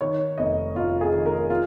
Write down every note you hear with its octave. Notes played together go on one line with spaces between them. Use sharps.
D#3 C#5
F1 D#5
F1 F4
G#4
D#3
A#4
F4